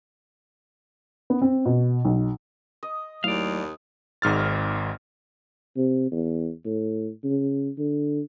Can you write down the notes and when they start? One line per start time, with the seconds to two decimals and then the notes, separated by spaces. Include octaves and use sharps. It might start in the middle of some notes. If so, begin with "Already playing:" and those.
1.30 B3
1.42 C4
1.65 B2
2.05 B1
2.83 D#5
3.24 D#2 F#3 A3 E4 D5 F5
4.22 G#1 G#2 F6 A6
5.76 C3
6.11 E2
6.65 A2
7.24 C#3
7.78 D3